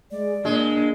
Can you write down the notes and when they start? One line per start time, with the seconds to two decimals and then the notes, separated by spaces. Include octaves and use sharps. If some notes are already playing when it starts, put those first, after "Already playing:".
0.11 G#3 D5
0.45 A#2 G#3 D4